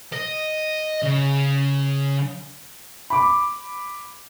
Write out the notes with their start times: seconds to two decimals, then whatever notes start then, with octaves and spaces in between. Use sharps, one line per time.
0.13 D#5
1.02 C#3
3.10 B5 D6